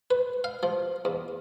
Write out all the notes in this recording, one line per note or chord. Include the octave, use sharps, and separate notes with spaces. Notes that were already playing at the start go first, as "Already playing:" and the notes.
B4
F5
F3
E2